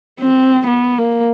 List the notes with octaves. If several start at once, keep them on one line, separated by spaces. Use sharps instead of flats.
C4
B3
A#3